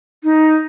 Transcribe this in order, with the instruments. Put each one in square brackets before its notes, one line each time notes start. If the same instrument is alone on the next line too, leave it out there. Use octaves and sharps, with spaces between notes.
[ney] D#4